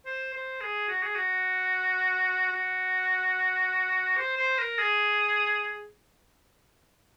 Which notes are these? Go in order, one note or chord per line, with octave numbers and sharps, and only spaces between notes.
C5
C5
G#4
F#4
G#4
F#4
F#4
C5
C5
A#4
G#4